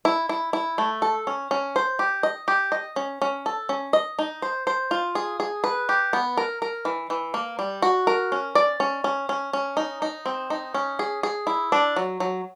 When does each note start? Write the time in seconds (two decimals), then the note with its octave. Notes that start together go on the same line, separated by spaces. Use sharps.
0.05 E4
0.29 E4
0.53 E4
0.78 A3
1.02 A4
1.27 C#4
1.51 C#4
1.76 C5
1.99 G4
2.23 D#5
2.48 G4
2.72 D#5
2.96 C#4
3.22 C#4
3.46 A4
3.69 C#4
3.93 D#5
4.19 D#4
4.42 C5
4.67 C5
4.91 F4
5.15 G#4
5.40 G#4
5.64 B4
5.89 G4
6.13 B3
6.37 A#4
6.62 A#4
6.85 E3
7.10 E3
7.34 A#3
7.59 G3
7.82 F#4
8.07 A#4
8.32 C#4
8.55 D5
8.80 C#4
9.04 C#4
9.29 C#4
9.53 C#4
9.77 D#4
10.02 D#4
10.26 C4
10.50 D#4
10.74 C#4
10.99 G#4
11.23 G#4
11.47 E4
11.72 D4
11.96 F#3
12.20 F#3